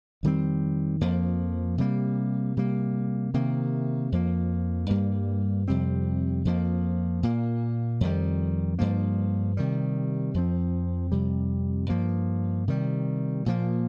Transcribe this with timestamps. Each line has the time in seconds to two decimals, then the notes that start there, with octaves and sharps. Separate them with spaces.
0.23 F2 D#3 G3 C4
1.01 F2 F3 A#3
1.78 C3 G3 A#3
2.57 C3 G3 A#3
3.34 C3 D#3 A#3
4.12 F2 F3 A#3
4.89 G2 G3 A#3
5.68 F2 C3 G3 C4
6.45 F2 F3 A#3
7.23 A#2 A#3
8.01 F2 D#3 G3
8.79 G2 F3 A#3
9.57 C3 D#3 G3
10.34 F2 F3 C4
11.12 F2 C3 G3
11.89 G2 F3 A#3
12.68 C3 D#3 G3
13.46 A#2 F3 A#3